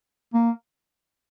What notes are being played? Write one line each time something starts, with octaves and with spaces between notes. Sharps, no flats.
A#3